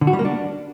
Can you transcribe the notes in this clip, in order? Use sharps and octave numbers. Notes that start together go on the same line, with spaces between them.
D3
F#4
G3
A#3
D4